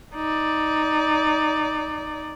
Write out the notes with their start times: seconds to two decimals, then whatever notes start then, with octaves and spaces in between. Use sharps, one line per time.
0.15 D#4 D5